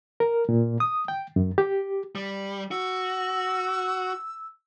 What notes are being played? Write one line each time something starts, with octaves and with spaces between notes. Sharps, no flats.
A#4
A#2
D#6
G5
F#2
G4
G3
F#4 E6